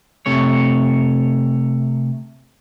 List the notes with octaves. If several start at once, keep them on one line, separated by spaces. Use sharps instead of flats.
C3 A3 C#5